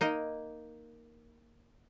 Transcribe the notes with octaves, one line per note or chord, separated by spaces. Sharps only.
A#3 D#4 D#5